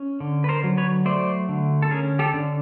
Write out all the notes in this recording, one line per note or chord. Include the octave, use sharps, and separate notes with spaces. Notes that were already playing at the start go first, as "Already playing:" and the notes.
Already playing: C#4
D3
B4
A#4 C5
F#3
B4 C#5
A3 C5 D5
D3
A4
C#4 G#4 A#4
G4 A4
D3